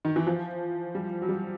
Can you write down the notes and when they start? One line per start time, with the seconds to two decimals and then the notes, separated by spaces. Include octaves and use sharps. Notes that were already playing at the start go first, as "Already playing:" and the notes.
0.05 D#3
0.16 E3
0.27 F3
0.95 G3
1.22 F#3
1.29 G3